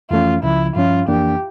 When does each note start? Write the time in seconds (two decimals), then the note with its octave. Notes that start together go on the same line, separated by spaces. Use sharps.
0.11 F2 E3 A3 C#4 F4
0.43 C#2 C#3 F3 E4
0.76 G2 F3 C#4 F4
1.08 F2 E3 A#3 D4 G4